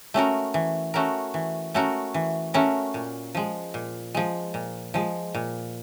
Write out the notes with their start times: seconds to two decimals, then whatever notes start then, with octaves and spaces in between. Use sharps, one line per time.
0.14 A3 C#4 F#4 A#4
0.54 E3
0.94 A3 C#4 F#4 A#4
1.34 E3
1.74 A3 C#4 F#4 A#4
2.14 E3
2.54 A3 C#4 F#4 A#4
2.94 A#2
3.35 F3 G#3
3.74 A#2
4.15 F3 G#3
4.54 A#2
4.94 F3 G#3
5.35 A#2